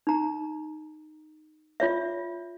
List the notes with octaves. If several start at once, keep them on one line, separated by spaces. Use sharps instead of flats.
D#4 A#5
F4 C#5 E5